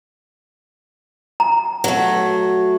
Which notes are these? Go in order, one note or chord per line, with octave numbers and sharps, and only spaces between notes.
A#5
F#3 A3